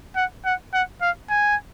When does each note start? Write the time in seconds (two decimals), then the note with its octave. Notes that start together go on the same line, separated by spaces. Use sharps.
0.16 F#5
0.46 F#5
0.74 F#5
1.02 F5
1.30 G#5